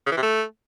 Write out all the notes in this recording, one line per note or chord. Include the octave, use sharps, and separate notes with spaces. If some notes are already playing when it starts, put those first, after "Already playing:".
C#3
E3
C3
A3